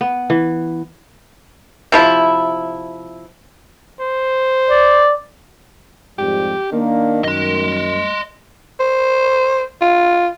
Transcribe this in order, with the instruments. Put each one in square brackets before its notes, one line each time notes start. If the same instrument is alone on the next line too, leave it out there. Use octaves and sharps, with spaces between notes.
[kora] B3
E3
[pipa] C3 F3 E4
[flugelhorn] C5
[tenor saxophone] D5
[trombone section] F2 G#2 G3 [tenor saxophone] G4
[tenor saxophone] D#3 [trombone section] A#3 D4
[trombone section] F#2 [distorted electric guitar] D#5 C6
[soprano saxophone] C5
F4